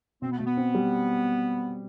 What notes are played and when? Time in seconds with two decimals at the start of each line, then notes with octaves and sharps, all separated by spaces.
0.21 B2 C4
0.31 B3
0.38 B2 A3
0.46 B3
0.57 C4
0.75 G3